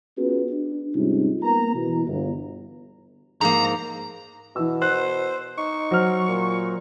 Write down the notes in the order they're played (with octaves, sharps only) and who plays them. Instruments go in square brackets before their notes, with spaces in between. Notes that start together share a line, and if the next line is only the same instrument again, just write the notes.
[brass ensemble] B3 C#4 F4 F#4 G#4 B4
D4
G#2 C3 G3 C#4 D#4 F4
A#3 B3 A#5
B2 E3
G1
[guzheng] G#2 F3 A#3 [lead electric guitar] A#5
[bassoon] B2 [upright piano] E3 E6
[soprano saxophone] C5 [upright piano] F#6
[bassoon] D#4 [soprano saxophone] C#6
[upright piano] F#3 C5 F6
[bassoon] A#2